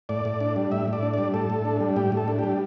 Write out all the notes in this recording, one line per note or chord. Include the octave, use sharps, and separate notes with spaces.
A2 D5
A2
D4
G3
A2 E5
A2
D5
D4
G3 D5
A2 A4
A2
D4
G3
A2 G4
A2
A4
D4
G3 G4